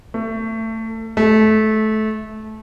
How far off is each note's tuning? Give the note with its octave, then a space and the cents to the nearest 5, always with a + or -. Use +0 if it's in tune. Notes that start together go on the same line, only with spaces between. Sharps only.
A3 +25
A3 -20